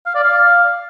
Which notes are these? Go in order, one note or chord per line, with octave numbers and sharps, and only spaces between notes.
F5
D5
F5